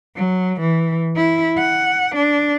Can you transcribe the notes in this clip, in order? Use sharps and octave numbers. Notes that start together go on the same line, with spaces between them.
F#3
E3
E4
F#5
D4